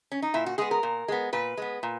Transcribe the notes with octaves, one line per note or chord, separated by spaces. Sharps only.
C#4
D#4
A#2 E4
F#4
G#3 B3 G#4
A#4
A#2
G#3 B3
A#2 B4
G#3 B3
A#2